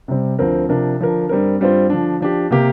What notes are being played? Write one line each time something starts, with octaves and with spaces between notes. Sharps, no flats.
C3 G3 C4
D2 D3 F3 C4 A#4
C3 F3 D4 A#4
D3 F3 D4 A#4
G2 G3 C4 A#4
G2 G3 C4 F4 C5
D3 F3 D4
F3 D4 G4
C3 A#3 G4 A#4